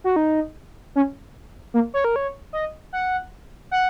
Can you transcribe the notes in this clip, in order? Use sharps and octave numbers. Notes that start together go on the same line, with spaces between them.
F#4
D#4
C#4
A#3
C#5
A#4
C#5
D#5
F#5
F#5